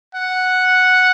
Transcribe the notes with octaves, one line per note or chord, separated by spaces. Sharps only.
F#5